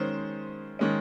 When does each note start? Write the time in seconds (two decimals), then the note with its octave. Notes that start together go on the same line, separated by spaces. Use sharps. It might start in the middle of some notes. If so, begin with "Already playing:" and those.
Already playing: D#3 G#3 C#4 C5
0.79 D#3 G#3 C#4